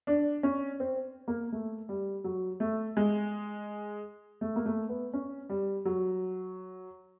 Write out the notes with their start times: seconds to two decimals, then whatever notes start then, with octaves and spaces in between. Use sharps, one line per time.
0.07 D4
0.43 C#4
0.80 C4
1.28 A#3
1.52 A3
1.89 G3
2.24 F#3
2.60 A3
2.97 G#3
4.41 A3
4.56 A#3
4.65 A3
4.89 B3
5.13 C#4
5.49 G3
5.85 F#3